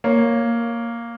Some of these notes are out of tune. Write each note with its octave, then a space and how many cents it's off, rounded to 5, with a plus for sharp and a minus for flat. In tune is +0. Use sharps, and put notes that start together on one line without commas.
A#3 +0 C#5 +0